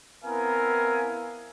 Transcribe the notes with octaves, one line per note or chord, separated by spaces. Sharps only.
B3 C4 E4 A#4 F5 G#5